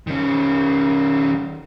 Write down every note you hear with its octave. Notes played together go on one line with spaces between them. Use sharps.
D#3 C#4